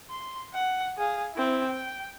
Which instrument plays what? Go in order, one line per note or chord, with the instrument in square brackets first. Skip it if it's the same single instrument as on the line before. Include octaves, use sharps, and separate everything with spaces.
[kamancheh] C6
F#5
G#4 F5
C4 E4
G5